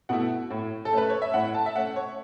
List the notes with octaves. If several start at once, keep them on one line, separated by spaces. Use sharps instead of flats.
B2 A3 E4 F#5
A2
A4
A3 C#4 B4
C#5
E5
A2 F#5
A5
E5
A3 C#4 F#5
C#5